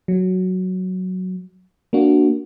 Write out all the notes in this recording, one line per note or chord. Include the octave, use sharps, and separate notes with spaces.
F#3
A#3 D4 F#4